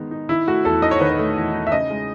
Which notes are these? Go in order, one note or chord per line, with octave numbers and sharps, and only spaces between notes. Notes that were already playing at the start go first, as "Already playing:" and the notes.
Already playing: D#3 G#3 B3 D#4
D#4
D#3 E4
A3 F#4
E2 A4
D#4 D#5
C#5
D#3 B4
C#5
A3
E2
D#4
E5
C#3 D#5
G#3